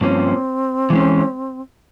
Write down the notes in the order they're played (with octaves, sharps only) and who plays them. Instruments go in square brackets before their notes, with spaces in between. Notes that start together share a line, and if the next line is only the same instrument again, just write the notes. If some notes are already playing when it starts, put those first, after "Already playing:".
[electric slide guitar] G2 F3 A#3 C#4 [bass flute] C4
[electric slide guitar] E3 G#3 C#4